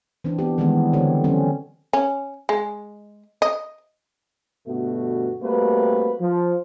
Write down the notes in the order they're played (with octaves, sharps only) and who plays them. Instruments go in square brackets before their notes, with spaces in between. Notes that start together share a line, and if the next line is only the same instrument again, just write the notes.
[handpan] E3 C4 D4
B3 G4
D#3 E3 G3 G#3 B3
D3 C4 G4 C#5
F#3 C4 C#4
[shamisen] C#4
G#3
D#5
[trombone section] G2 B2 D3 A3 B3 F#4
G3 A3 A#3 C4 F#4 B4
F3